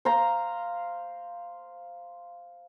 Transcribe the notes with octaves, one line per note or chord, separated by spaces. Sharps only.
C5 F5 A#5